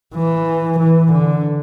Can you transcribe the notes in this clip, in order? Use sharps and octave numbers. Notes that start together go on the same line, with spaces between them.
E3
E3
D3